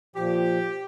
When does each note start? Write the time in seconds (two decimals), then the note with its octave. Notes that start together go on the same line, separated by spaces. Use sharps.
0.16 A#2 F3 G4